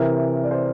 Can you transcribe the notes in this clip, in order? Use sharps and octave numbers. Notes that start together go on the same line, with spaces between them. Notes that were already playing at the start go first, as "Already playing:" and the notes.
Already playing: C3 E3 A#4
D5
C5